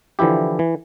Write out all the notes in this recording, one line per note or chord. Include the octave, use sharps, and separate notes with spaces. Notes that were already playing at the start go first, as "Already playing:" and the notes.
D3 E3 F3 E4 G4
E3